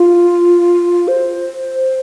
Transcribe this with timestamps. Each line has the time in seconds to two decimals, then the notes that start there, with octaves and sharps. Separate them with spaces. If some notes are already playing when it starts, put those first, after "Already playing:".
Already playing: F4
1.08 C5